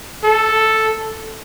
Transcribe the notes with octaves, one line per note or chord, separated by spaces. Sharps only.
A4